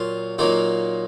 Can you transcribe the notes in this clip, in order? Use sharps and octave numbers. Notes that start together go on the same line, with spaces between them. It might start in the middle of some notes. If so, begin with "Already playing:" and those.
Already playing: A#2 F#3 F4
A#2 F#3 A#3 D#4 F4